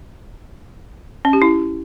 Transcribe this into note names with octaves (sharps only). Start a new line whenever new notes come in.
C#4
G4
E4